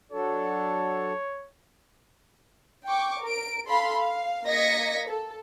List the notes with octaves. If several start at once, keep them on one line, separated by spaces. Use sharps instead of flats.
F#3 D4 A4 C#5
G5 C#6 D6
A#4 D7
A4 F5 B5 C6
F5
A#3 D#5 G#6 A#6 B6 C#7
A4